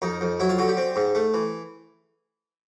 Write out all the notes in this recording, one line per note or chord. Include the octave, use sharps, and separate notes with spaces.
F2 D#4
F2
F#3 E4
F4
D3 F#4
G4
C4
G#2
A3
E3